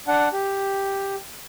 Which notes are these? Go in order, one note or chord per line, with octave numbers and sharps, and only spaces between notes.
D4 F#5
G4